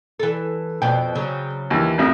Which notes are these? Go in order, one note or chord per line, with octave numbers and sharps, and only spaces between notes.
E3 A4
F2 B2 G5
C#3 F#3
D#2 E3
A1 F2 E5